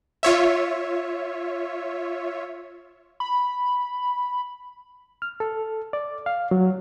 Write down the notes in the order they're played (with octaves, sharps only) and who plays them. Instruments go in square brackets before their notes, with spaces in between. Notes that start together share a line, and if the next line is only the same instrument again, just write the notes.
[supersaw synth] F4 C#5 E5
[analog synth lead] B5
[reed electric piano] F6
A4
D5
F5
F#3